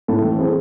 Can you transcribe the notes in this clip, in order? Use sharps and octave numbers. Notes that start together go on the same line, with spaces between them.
A2 A4
E3
C4 G#4